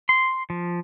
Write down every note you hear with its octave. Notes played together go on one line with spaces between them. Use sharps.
C6
F3